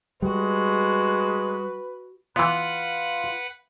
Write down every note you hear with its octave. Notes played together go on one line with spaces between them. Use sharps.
G3 G#3 F#4 B4
E3 B3 F4 B4 F#5